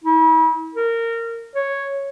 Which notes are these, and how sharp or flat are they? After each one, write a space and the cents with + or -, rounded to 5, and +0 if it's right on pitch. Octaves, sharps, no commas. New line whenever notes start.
E4 -40
A#4 -20
C#5 -5